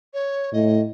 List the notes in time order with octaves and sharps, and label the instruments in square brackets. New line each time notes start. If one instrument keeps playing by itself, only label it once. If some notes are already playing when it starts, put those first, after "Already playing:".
[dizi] C#5
[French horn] A2 [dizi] D#5